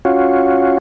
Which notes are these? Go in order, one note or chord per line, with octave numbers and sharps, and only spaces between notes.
C#4 F4 F#4